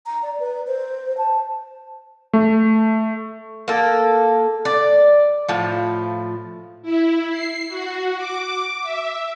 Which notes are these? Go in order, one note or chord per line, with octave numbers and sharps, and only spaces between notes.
A#5
D5
B4
C5
A5
A3
A#3 A4
D5
A2 F3
E4
C7
F#4
D6
E5